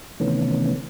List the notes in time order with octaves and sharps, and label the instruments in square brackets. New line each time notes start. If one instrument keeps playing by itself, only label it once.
[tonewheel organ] C3 D#3 E3 A3 B3 C#4